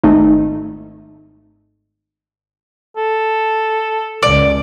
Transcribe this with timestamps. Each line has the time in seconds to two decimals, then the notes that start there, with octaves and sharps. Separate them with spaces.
0.04 G#1 A3 D#4
2.97 A4
4.23 C#2 C#3 D5